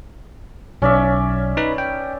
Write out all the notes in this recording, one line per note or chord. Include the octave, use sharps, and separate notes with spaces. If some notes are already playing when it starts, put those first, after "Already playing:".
B1 C#4 D5 E5
D#4 B4 B5
G5